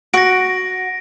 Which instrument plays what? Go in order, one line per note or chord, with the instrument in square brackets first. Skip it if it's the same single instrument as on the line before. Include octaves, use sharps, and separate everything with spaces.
[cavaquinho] F#4 [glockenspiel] A#6 D7